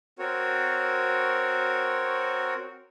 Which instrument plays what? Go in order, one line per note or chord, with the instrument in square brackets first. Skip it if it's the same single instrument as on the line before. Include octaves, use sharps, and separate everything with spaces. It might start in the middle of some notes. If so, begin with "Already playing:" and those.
[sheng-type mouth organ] C4 F#4 A#4 C#5